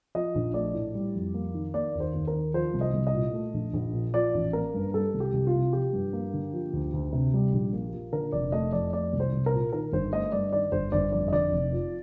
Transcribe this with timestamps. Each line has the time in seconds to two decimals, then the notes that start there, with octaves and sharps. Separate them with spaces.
0.15 F3 D#5
0.35 A#1
0.54 A3 D5
0.74 A2
0.95 G3
1.15 F2
1.34 A#3
1.54 D#3
1.74 A#3 D5
1.95 D#2
2.00 C5
2.13 D#2
2.27 A#4
2.33 D#3
2.54 F3 C5
2.74 C2
2.81 D#5
2.94 C2
3.07 D#5
3.14 A#2
3.33 A3
3.54 A#1
3.73 A#1
3.93 A#2
4.14 F3 D5
4.34 A1
4.53 A#3 A#4
4.74 G2
4.94 G3 A4
5.14 C2
5.20 G4
5.33 C2
5.47 F4
5.54 C3
5.73 F3 G4
5.93 G2
6.13 A#3
6.33 D3
6.53 F3
6.73 D2
6.93 D2
7.13 C3
7.34 G3
7.53 A#1
7.73 A#3
7.93 A#2
8.12 D3 A#4
8.32 F1 D5
8.52 A3 D#5
8.72 F2 D5
8.93 A3 D5
9.13 C2
9.20 C5
9.33 C2
9.46 A#4
9.53 A#2
9.73 D#3 A#4
9.93 G1 C5
10.13 A3 D#5
10.32 G2 D5
10.53 D#3 D5
10.72 G1 C5
10.92 G1 D5
11.12 F2 D5
11.28 D#5
11.32 D3 D5
11.52 F1
11.73 F3